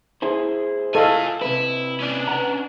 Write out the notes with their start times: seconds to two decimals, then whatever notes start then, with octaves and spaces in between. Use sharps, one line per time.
0.22 E4 G#4 C5
0.95 F4 A4 D#5 F5 G#5
1.41 C3 E4 B4
2.00 C#4 D4
2.28 B4 F#5 A#5